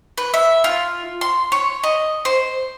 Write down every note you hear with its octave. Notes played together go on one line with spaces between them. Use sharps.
B4
E5
F4
C6
C#5
D#5
C5